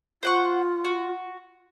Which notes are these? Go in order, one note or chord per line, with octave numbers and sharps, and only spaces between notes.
F4 C5 F#5 C#6
F#4